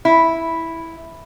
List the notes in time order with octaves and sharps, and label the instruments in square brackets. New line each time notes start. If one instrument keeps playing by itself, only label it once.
[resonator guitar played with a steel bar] E4